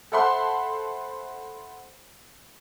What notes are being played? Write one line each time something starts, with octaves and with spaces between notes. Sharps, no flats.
A4 C5 E5 F#5 B5 C6